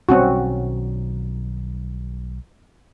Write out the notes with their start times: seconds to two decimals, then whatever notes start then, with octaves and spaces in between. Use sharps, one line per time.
0.09 B1 D#3 G3 C4 C#4 F#4